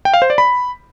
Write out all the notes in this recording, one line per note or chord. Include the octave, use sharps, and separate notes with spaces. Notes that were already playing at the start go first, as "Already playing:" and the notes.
G5
F5
C5
D5
B5